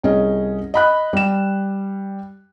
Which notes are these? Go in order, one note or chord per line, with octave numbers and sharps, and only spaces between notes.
C2 C#4 G#4 D#5
D#5 B5 F#6
G3 E7